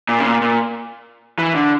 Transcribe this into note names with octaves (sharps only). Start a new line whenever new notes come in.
A#2
C#3
A#2
A#2
E3
D3